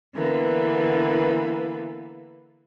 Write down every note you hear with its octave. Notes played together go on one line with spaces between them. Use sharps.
D3 E3 A#3 B3